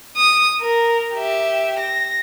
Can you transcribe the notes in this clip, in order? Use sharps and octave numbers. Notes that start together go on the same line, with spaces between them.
D#6
A#4
G4 E5
A#6